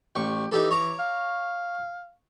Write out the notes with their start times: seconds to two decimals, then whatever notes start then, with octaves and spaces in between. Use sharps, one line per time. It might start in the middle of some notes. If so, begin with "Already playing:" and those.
0.16 A1 G4 C#6
0.52 E3 D#4 G4 A4
0.71 C#5 A#5 D6
0.99 F5